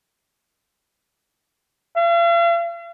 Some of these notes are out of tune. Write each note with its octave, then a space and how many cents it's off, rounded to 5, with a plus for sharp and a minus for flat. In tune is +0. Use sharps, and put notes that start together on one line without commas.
F5 -45